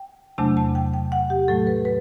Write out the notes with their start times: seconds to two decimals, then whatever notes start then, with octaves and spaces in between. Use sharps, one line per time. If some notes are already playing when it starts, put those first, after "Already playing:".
Already playing: G5
0.38 E2 C3 F#3 A3 D4 A5
0.57 A5
0.75 G5
0.94 G5
1.12 F#5
1.30 G4
1.48 A2 F#3 A3 A4
1.67 B4
1.85 B4